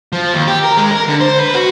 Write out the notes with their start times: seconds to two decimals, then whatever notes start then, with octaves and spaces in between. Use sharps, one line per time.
0.12 F3
0.34 D#2
0.47 G4
0.63 A#4
0.77 G#3
0.91 A#4
1.09 D3
1.20 C5
1.40 B4
1.55 F#4